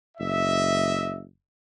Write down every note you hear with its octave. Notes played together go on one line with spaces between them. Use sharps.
F#1 D#5 E5